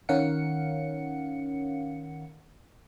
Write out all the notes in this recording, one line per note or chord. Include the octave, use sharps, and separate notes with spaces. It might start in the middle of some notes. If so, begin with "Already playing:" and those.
D#3 C#4 A#4 F5 F#5 C#7